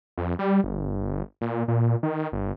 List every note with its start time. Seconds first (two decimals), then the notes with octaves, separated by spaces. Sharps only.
0.18 F2
0.39 G3
0.64 G1
1.41 A#2
1.68 A#2
2.03 D#3
2.33 G1